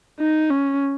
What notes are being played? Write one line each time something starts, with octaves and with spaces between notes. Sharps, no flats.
D#4
C#4